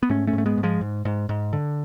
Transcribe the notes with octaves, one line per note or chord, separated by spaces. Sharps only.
B3
G#2 A3 C#4
A3 C#4
G#2
A3
G#3 B3
G#2
F3 G#3
G#2
G#2
G#2
D3